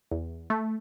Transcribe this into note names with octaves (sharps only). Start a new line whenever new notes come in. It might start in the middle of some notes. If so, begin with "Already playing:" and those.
E2
A3